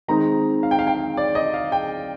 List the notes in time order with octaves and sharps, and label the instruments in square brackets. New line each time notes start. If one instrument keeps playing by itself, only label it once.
[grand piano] D#3 G#3 C4 D#4 A#5
F5
G5
F5
G5
F5
D5
D#5
F5
G5